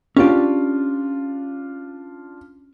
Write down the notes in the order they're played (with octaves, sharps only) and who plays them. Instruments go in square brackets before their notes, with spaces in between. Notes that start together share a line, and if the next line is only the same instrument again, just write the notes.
[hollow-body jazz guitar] C#4 G4 D5 [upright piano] D4 F4